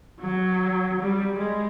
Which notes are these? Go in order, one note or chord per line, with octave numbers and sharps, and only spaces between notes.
F#3
G3
G#3